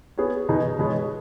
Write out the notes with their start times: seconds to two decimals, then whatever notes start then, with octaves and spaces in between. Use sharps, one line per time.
0.18 B3 G#4 C#5
0.49 B2 B3 D#4 G#4
0.79 B2 G#3 B3 G#4 C#5